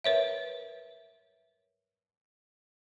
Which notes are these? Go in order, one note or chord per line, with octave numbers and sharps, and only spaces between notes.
A#4 B4 C#5 E5